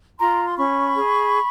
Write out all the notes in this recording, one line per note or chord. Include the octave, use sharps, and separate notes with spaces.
F4 A#5 C6
C6
C#4 B5 C#6
G#4